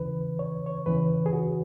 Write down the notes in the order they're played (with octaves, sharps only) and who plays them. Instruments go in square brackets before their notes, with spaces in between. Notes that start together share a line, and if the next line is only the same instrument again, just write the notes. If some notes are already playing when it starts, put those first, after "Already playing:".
Already playing: [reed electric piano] E2 C#3 E3 B4
C#5
C#5
E2 C#3 E3 B4
G#4
F#4